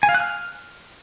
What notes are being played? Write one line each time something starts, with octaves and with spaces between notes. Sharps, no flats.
G#5
F5
F#6
F6